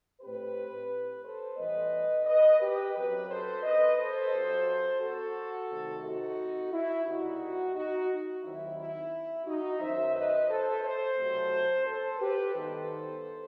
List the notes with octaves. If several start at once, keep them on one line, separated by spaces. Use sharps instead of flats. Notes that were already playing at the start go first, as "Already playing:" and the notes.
A2 G3 C4 G4 B4
A4 C5
A2 E3 G3 B3 B4 D#5
B4 D#5
G4 B4
F#2 F#3 C4 G4 B4
A4 C5
B4 D#5
A4 C5
G2 F#3 C4
F#4 A4
C2 C3 D#3 A3
D#4 F#4
E4
C2 B2 G3 D#4 F#4
D#4 F#4
D#2 D#3 F#3 C4 E4
E4
D#4 F#4
F#2 D#3 F#3 C5 E5
B4 D#5
A4 C5
A4 C5
C2 B2 F#3 A3 C4
A4 C5
G4 B4
G2 D#3 G3 B3 A4 C5